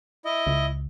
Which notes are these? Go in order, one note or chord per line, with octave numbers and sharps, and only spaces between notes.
E4 D#5
C#2